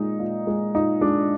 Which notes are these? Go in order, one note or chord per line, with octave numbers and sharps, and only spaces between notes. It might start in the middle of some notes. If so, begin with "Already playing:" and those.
Already playing: A#2 G#3 D#4
A#2
G#3
A#2 D#4
G#3 D4